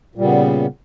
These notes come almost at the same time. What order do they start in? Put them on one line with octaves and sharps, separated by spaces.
A#2 G3 C#3 B3